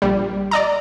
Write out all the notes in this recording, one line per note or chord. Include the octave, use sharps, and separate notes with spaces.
A#1 G3
D5 D#5 A#5